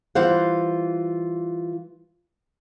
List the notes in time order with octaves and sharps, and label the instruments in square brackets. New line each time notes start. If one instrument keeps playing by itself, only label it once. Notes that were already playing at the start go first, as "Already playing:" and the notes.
[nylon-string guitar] E3 G3 F4 C5 F5 F#5